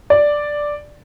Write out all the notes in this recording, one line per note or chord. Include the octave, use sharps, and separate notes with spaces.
D5